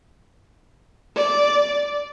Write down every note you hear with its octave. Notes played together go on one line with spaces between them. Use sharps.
D5